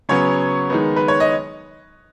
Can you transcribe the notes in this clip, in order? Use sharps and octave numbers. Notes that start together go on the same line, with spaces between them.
C#3 F#3 B3 C#5
D#3 G#3 B3
B4
C#5
D#5